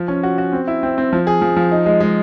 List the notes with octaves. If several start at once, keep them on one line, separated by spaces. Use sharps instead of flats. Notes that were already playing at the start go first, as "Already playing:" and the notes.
Already playing: F3
C#4
F#4
F#4
C4
E4
C4
C4
F3
G#4
F3
F3
D#4
G#3
G#3